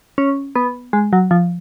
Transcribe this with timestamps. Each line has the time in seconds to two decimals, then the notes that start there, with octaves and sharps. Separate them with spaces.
0.18 C#4
0.56 B3
0.93 G#3
1.13 F#3
1.31 F3